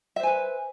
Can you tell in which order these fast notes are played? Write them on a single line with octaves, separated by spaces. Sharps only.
E5 C5 G#5 B4